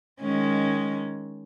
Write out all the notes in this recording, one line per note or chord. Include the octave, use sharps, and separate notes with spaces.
D#3 G#3 C#4